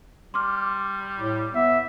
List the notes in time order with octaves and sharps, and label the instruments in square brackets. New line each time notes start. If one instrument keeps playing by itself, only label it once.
[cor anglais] G3 [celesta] C6 D6 F6
[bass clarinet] A2
[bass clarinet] B3 [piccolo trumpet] E5